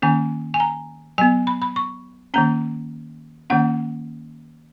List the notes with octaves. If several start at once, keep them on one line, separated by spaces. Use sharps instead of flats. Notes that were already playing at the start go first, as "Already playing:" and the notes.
D#3 A#3 C#4 G#5
G#5
A#5
F#3 B3 G#5
B5
B5
C#6
D#3 A#3 C#4 A#5
D#3 A#3 C#4 F#5